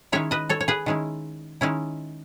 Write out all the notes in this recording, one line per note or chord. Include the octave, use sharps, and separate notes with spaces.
D#3 G#3 C#4 E4 C#5 E5
B4 D#5
A4 C#5
C#5
G#4 B4
D#3 G#3 C#4 E4
D#3 G#3 C#4 E4